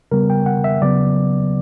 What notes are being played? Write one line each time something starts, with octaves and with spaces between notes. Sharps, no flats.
C#3 G3 B3 A#4
G5
F#5
E5
C#3 F#3 B3 D5